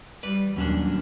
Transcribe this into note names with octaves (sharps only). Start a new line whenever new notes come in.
G3 B4 D5
D#2 A#2 F#3 G3 C#4 D4